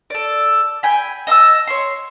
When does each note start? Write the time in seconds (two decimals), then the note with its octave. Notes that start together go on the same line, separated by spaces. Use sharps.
0.10 A4 D5
0.83 G5 G#5 B5
1.27 D#5 E5 A5 E6
1.67 C#5 C6